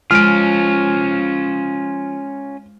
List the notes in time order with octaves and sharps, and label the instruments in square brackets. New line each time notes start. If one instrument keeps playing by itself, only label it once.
[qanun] F3 [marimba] G#3 [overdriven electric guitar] C#4 F4 [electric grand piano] F6 D7